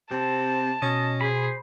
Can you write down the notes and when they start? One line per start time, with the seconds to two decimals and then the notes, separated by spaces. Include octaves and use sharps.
0.11 C3 C4 A5
0.82 B2 C#4 D#5
1.21 G#4 C5 B5